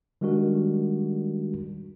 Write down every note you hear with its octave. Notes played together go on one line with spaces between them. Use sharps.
D#3 G3 G#3 D4 F#4 A#4